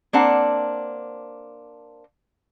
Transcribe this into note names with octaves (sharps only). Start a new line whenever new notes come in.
A#3 C4 D4 F#5